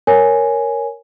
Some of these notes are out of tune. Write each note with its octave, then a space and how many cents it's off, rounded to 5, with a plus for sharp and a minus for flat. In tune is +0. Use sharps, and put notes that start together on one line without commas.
A#4 +0 C#5 +0 G#5 +0